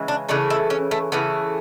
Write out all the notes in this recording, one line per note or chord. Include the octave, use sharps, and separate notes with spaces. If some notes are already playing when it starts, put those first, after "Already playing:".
Already playing: C#3 E3 G#3
D4
C#3 E3 A3 D4
E4
C#4
A3
C#3 E3 A3 B3